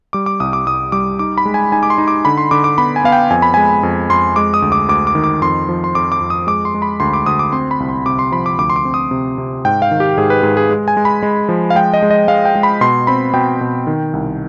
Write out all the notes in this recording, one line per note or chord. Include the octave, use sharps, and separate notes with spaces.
G3 D6
D6
C2 D#6
D6
C2 D#6
G3 D6
D#4 D6
B5
G#3
G#5
D#4 G#5
D6
C6
D#4
D6
D3 B5
C6
D3 D6
D6
B3 B5
G#5
B3 F5
G5
F2 G#5
B5
G#3 G#5
F2
F2 C6
G#3 D6
D#6
D2
D6
D2 D6
D6
D#3
D6
F2 C6
F3
C6
F2 D6
D6
F2
D#6
G#3 D6
C6
G#3
B5
D2 C6
D6
D2 D#6
D6
C4 C6
B5
C2
C6
C3 D6
C6
F3 B5
D6
D2 D6
C6
D6
C4
D#6
C3
C3
G#2 G5
F5
D#3
G4
G#2 G#4
B4
G#2 G#4
G#4
G#3
G#5
G#3
B5
G#3
F3
F5
G#3 G5
D#5
G#3
D#5
G#3 F5
G5
G#3
B5
B2 C6
C4 B5
B2 G5
B2
D#3
C2